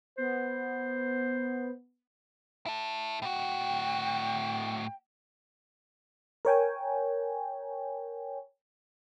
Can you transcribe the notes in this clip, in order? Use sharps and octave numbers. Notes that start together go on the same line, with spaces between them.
B3 C5
E4 A4
A2 F#4 G5
A#4 C#5 G5 G#5